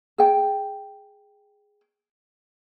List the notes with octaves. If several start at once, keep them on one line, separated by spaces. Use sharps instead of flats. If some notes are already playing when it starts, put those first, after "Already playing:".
G#4 G5